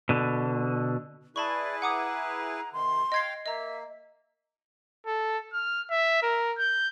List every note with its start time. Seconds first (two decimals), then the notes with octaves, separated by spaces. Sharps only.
0.09 B2 D3
1.36 E4 G#4 B4 D5 A5 B5 C#6
1.82 F#5 A#5 D6 D#6
2.73 C3 D#3 C6
3.12 D#5 F5 G5 G#6 C7
3.46 A#3 D#5 E5 A#5
5.07 A4
5.53 F6
5.91 E5
6.23 A#4
6.59 G6